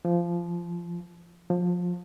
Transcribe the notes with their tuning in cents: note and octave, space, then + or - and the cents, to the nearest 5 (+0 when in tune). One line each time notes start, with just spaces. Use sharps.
F3 -20
F3 +20